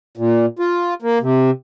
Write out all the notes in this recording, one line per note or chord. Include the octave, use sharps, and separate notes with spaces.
A#2
F4
A#3
C3